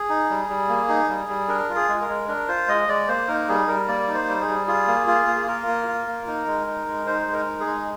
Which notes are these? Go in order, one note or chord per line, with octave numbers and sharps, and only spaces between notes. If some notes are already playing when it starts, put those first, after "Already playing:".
Already playing: G#4
D#4
G3
G3
A#3
D#4
G3
G3
D4 A#4
F4
G#4
G#3
A#4
G#3
D4 A#4
F4 C5
G#3 D#5
G#3 D5
A#3 C5
D#4 A#4
G3 G#4
G3 A#4
A#3 D5
D#4
C5
G3
G#4
G3
F4 G#4
A#3
F4
A#3
G#4
F4 A#4
A#3
F4
A#3
D#4
G#3
D#4
G#3
D#4 C5
G#3
A#4
D#4
G#4
G#3